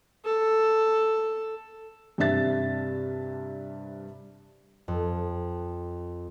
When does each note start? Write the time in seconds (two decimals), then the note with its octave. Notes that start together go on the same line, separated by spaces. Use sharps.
0.24 A4
2.18 G2 C3 D4 E5 A6
4.88 F2